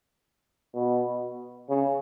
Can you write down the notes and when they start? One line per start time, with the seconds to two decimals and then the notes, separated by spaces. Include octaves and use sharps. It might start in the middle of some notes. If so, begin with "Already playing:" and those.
0.75 B2
1.69 C#3